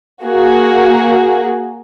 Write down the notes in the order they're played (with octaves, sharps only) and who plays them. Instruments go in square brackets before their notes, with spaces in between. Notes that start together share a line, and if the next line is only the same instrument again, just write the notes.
[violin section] A#3 F#4 G#4